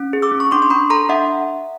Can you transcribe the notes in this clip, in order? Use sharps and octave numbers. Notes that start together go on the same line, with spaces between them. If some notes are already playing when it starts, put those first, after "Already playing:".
Already playing: C#4
G#4
D6 E6
C#4
C#6
D4 C6 D6
C6
D4 B5 C#6
A4 A#5 C6
D4 E5 F#5